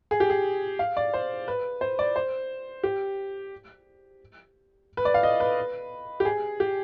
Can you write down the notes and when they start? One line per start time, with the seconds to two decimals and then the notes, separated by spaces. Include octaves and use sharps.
0.11 G#4
0.20 G4
0.30 G#4
0.79 F5
0.97 D5
1.14 C5
1.48 B4
1.81 C5
1.99 D5
2.16 C5
2.83 G4
4.97 B4
5.05 D5
5.14 F5
5.23 D#5
5.40 B4
6.20 G4
6.25 G#4
6.60 G4